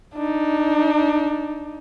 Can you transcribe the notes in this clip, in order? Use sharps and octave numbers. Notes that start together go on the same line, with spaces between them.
D4 D#4